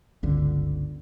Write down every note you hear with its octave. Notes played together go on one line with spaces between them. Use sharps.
G1 C#2 D3